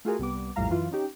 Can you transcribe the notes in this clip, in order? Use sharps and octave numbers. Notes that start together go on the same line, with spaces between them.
A3 F4 F#4 G#4 A#4
C2 G3 B3 D6
A#1 F2 A2 G3 F5 A#5
F#2 E3 F4
C#4 D#4 G4